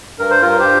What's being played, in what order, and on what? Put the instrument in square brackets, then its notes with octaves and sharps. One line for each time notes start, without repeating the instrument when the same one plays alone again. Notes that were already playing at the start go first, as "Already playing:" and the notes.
[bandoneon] G2 A#4
C5
G2 F4 A#4
G4 C5